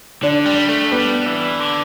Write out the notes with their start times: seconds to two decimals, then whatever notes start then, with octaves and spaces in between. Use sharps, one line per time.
0.23 D3 D4
0.45 G3
0.69 A3
0.92 G3 B3
1.26 E3
1.60 D3